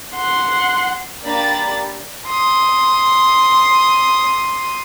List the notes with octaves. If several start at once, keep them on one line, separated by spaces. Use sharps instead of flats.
F#5 C6
A#3 D4 G4 A#5 B5 A6
C6 D#6